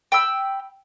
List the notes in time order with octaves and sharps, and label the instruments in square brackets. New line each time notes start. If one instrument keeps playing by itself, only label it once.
[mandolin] G5 B5 E6